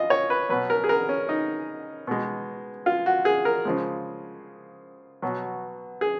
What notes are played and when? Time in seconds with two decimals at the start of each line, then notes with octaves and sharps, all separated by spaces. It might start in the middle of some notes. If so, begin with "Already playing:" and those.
Already playing: F4 D#5
0.10 C#5
0.30 B4
0.49 B2 F#3 B4
0.70 A#4
0.84 G#4
0.89 A#4
1.09 C#4
1.29 D#4
2.07 B2 G#3
2.86 F4
3.06 F#4
3.25 G#4
3.45 A#4
3.65 C#3 F3 G#3
5.22 B2 F#3
6.01 G#4